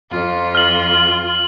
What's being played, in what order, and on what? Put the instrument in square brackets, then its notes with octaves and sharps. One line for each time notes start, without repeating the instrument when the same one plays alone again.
[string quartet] F2 [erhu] F4
[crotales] F6 F#7